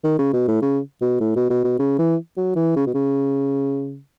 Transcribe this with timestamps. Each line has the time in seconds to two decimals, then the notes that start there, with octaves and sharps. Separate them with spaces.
0.04 D#3
0.19 C#3
0.33 B2
0.48 A2
0.62 C#3
1.01 B2
1.20 A2
1.36 B2
1.50 B2
1.64 B2
1.79 C#3
1.99 E3
2.37 F#3
2.56 E3
2.76 C#3
2.87 B2
2.94 C#3